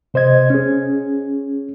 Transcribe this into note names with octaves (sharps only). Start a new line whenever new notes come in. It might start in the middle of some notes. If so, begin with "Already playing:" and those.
C3 C5 D#5 G#6
C#4 G#4